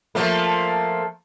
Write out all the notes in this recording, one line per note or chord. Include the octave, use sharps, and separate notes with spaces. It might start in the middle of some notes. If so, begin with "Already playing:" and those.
F3 A3 A#3